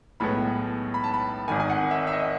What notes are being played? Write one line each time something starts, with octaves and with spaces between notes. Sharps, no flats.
B1 A2 G#3 B3 B5
B5
A5
B5
G#1 G#2 D#3 G#5
G#5
F#5
E5
E5
D#5